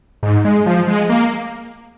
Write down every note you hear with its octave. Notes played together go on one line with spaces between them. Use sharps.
G#2
G#3
F3
G#3
A#3